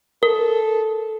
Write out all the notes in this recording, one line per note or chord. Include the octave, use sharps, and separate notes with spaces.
A4 A#4